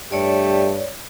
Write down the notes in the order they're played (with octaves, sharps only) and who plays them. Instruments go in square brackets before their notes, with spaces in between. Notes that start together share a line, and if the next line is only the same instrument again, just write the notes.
[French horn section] G2 [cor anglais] A3 [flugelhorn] G4 [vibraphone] C#5 D5